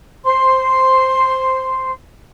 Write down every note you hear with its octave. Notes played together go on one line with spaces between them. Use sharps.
C5 C6